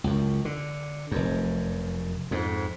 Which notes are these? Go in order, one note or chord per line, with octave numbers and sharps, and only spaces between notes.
C#2 F#2
D3
F1 F#2
F2 G#2